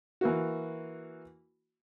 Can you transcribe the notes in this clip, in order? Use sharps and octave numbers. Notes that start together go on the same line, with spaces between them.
E3 A#3 F#4